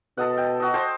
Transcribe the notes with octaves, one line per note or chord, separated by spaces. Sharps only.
B2 A4 D#5 F#5
G5
F#4 D#5
C5 G5 A5